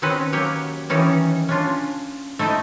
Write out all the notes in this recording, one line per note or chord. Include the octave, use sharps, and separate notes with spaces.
D#3 C4 C#4 B4 D#5
F#3 A#3 G4 C#5
D#3 E3 G3 C#4 D#4
C#4 D4 F4
A3 D#4 E4 D#5